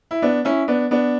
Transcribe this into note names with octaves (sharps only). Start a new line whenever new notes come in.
E4
B3 D4
C#4 E4
B3 D4
B3 D4